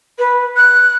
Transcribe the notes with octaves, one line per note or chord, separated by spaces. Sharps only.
B4
F#6